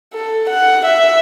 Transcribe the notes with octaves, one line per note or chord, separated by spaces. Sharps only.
A4
F#5
E5